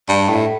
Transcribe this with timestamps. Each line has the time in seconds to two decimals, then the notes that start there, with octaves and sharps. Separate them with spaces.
0.09 G2
0.29 A2